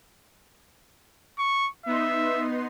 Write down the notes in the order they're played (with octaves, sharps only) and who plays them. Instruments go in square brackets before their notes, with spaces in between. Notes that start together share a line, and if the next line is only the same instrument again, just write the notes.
[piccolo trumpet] C#6
[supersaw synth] B3 D#4 C6 [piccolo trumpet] E5